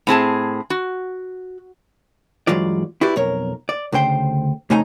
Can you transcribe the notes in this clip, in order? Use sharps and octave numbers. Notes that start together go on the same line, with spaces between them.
A2 C4 G#4 A5
F#4
G2 E3 F#3 G#3 F4 D5
E4 F#4 G4 B4 D5
B1 F2 A#4 C#5
D5
D2 C#3 C5 G5 C6
F2 C#3 A3 D#4 G#5 A#5